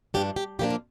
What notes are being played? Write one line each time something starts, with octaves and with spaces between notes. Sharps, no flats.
G2 F3 D4 G4
G4
A#2 F3 A#3 D4 G4
F4